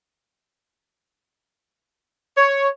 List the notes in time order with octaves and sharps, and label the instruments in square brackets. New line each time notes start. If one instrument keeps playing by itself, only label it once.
[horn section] C#5